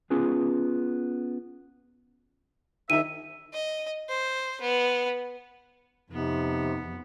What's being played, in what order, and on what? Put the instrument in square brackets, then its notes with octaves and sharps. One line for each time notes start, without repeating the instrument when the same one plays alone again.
[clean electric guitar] B3 C#4 F4 G#4
[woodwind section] C2 E5 [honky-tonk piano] D#3 D#4 [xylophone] D#7
[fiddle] D#5
C5
B3
[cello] F2 [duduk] C3 [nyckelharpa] B3 [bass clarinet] D#4